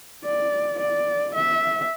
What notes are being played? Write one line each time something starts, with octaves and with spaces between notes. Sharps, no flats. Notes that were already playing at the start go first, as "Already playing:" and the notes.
D5
D5
E5